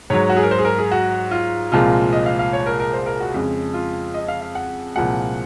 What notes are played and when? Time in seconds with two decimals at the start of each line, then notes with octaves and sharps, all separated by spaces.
0.10 G#2 F#3 C#5
0.30 F#4
0.37 G#4
0.43 A#4
0.51 C5
0.58 G#4
0.65 A#4
0.78 G#4
0.92 F#4
1.31 F4
1.72 C2 A#2 F3 G#3 F4
2.13 D#5
2.26 F5
2.39 F5
2.53 C#5
2.66 A#4
2.80 A#4
2.93 C5
3.06 A#4
3.20 F#4
3.34 F2 C#3 G#3
3.74 F4
4.14 D#5
4.28 F5
4.41 F5
4.55 F#5
4.95 C2 A#2 F3 G#3 F#5